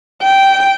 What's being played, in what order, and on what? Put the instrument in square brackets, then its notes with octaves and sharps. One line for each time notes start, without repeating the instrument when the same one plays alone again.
[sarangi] G5